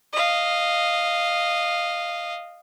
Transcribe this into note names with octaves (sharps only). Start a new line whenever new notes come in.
D#5 F5